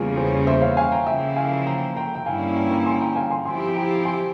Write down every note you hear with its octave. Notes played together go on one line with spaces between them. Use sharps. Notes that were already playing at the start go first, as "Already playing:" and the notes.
Already playing: E2 C#3 G3 A#3 C#4 F4 G#4
G#4 C5
C5 E5
C#5 F5
F5 G#5
G5 A#5
C#3 F3 A#3 E4 E5 G5
F5 G#5
G5 A#5
G5 A#5
G5
G2 G3 A#3 C#4 E4 F5 G#5
G5 A#5
G5 A#5
G#5 C6
G5 A#5
F5 G#5
G#5 C6
F3 C4 E4 G4 G#5 C6
G5 A#5
G#5 C6